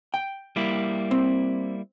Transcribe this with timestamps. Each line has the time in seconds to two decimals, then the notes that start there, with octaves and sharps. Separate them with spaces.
0.14 G5
0.56 G3 A#3 E4
1.11 C4